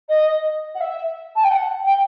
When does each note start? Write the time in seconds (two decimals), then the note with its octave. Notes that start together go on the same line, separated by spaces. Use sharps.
0.09 D#5
0.75 F#5
0.80 E5
1.36 A5
1.43 G5
1.51 F#5
1.86 G5